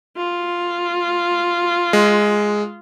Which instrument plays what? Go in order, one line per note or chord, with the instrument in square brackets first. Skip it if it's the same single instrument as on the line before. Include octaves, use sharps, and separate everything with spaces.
[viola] F4
[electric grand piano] G#3